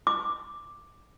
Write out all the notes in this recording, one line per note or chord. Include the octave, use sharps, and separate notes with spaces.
D6